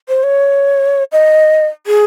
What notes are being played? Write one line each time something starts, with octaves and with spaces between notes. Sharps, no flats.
C5
C#5
D#5
G#4